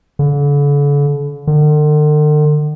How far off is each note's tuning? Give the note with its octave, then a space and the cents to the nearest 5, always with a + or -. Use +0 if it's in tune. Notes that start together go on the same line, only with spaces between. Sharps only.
D3 -40
D3 +45